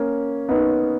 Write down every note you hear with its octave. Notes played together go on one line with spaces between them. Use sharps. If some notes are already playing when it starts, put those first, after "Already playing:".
Already playing: A#3 C#4
B3 D#4